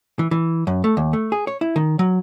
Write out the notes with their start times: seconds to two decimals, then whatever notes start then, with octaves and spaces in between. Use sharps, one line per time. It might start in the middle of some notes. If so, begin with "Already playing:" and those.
0.19 E3
0.31 E3
0.67 F#2
0.84 A3
0.97 D#2
1.13 A3
1.32 G#4
1.47 C#5
1.61 E4
1.76 D#3
1.99 F#3